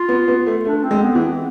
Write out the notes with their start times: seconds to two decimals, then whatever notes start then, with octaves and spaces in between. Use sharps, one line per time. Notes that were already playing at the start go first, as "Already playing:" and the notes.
Already playing: F4
0.09 B3
0.28 B3
0.46 A3
0.65 A3 D4
0.84 C4
0.91 G#3
1.02 B3
1.15 E3
1.21 C4